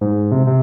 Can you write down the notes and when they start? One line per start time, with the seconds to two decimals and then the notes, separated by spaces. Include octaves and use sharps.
0.01 G#2
0.32 C3
0.47 C3